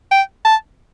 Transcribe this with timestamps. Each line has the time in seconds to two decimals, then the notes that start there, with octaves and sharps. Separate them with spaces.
0.11 G5
0.45 A5